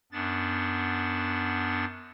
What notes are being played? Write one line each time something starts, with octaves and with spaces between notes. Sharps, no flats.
F#2 B3 D4 A6